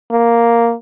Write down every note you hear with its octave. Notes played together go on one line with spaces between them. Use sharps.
A#3